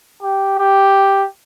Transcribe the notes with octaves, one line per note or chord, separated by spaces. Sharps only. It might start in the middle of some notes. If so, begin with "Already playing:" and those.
G4
G4